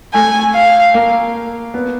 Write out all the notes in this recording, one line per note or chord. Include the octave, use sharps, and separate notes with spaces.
A3 G#5
F5
A#3
B3